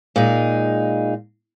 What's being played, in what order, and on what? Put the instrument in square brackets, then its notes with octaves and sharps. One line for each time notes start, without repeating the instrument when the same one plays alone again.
[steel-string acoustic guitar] A#2 G#3 D#4